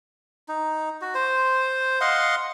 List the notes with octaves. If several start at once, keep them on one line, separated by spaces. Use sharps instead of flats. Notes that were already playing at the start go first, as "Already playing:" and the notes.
D#4
F#4
C5
D#5 F5 F#5 C6